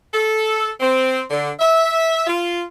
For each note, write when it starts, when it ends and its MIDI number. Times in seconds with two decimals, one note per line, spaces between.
0.14 0.70 69
0.80 1.21 60
1.30 1.49 50
1.60 2.24 76
2.27 2.62 65